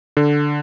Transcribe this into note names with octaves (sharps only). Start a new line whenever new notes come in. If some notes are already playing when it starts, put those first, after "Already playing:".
D3